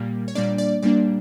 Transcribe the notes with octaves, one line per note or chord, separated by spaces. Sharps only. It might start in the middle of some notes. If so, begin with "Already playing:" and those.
Already playing: A#2 G3 A#3
C#5
A#2 G3 A#3 D4 D5
D5
A#2 G3 A#3 D4 D5